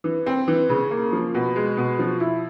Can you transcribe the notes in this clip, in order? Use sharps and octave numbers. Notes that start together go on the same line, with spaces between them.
E3
C4
E3
C#3
A#3
F3
B2
G#3
B2
F3
E4